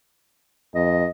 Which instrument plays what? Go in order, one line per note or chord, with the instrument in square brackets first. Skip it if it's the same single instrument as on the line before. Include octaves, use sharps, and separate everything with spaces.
[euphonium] F2 [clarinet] D#5